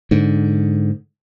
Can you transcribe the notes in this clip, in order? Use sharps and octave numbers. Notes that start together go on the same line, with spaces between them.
G#2 D3